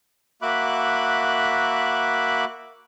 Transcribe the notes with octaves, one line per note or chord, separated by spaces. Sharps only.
A#3 F#4 E5 B5 D6 F#6